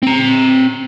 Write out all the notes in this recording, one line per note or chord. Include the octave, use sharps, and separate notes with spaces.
C4 A#5